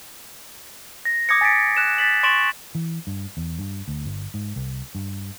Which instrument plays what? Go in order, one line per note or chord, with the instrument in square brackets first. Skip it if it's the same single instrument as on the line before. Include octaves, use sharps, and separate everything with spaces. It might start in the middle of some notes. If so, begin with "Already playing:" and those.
[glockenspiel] A#6
D6 D#6 G#6 A#6 C#7
G#5 A6 B6 C#7 D7
F#6 E7
A6 B6 F#7
C6 C#6 A6 D7 E7 F#7
[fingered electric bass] E3
G2
E2
G2
D2
G1
G#2
C2
G2